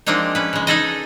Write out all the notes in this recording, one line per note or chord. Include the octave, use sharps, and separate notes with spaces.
F3 G#3 A#3 C4 D4 D#4
C#4 B4
C#3 G#3
D#4 G#4 A4 D#5